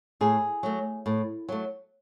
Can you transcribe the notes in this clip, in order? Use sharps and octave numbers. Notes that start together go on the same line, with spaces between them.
A2 G#4
F#3 A3
A2
F#3 A3